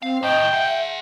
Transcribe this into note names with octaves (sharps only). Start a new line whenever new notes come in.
C4 F5
D#2 A2 D#5 G5
G#4 E5 F#5